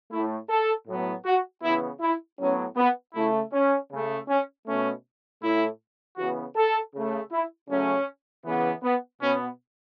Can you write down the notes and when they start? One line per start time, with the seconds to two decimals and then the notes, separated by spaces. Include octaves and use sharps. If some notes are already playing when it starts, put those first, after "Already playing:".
0.11 A2 A3 E4
0.49 A4
0.87 A2 F#3 B3
1.25 F#4
1.62 C#3 E3 B3 E4
2.01 E4
2.39 A2 F#3 B3 C#4
2.77 B3
3.14 C#3 A3 E4
3.53 C#4
3.91 C#3 A3
4.28 C#4
4.66 B2 A3 C#4
5.41 A2 A3 E4
6.18 C#3 E3 B3 F#4
6.56 A4
6.94 C#3 A3
7.32 E4
7.69 C#3 F#3 A3 C#4
8.45 C#3 E3 B3
8.83 B3
9.21 B2 B3 C#4